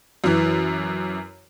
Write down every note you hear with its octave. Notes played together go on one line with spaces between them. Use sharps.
F#2 E3